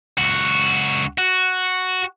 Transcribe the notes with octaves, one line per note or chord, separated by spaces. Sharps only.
C#2 F#4
F#4